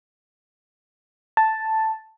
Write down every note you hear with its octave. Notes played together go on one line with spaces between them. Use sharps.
A5